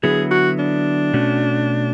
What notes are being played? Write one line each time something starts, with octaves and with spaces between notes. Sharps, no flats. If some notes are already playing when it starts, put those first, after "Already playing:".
D3 F#3 B3 E4 G#4
F#4
D4
B2 A3 C#4 F#4